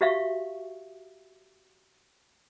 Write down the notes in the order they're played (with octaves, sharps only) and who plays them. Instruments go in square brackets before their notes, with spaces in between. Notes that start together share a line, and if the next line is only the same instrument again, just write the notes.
[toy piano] F#4 G4 E5 F5 C#6